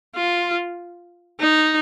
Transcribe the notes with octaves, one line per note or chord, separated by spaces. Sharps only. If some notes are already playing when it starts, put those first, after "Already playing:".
F4
D#4